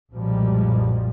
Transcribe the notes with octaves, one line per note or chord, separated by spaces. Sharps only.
B1 F#2 A#2 F3 G3 G#3